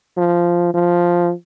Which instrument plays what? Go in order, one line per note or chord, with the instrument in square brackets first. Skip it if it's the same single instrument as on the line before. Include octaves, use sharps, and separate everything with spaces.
[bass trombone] F3
F3